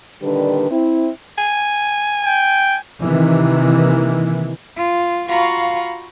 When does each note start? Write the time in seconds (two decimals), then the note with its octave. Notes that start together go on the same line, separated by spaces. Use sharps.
0.22 A#2 D3 D#3 G3 D4 B4
0.70 C4 E4
1.38 G#5
2.25 G5
3.01 C3 D#3 E3 A#3
4.77 F4
5.29 F4 F#4 F5 A#5 B5 C#6